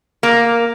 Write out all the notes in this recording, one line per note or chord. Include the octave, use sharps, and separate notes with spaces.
A#3